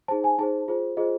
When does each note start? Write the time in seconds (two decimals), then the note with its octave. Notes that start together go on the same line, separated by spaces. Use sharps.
0.08 D#4 G#4 C5 A5
0.24 G#5
0.38 D#4 G#4 C5 A5
0.68 F4 G#4 C5
0.97 F4 G#4 C5 D#5